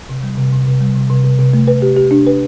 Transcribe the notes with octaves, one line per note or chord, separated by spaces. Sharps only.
C3
G3
C3
C3
C3
G3
C3
C3
C3
C3
A3
B4
G4
G4
D4
B4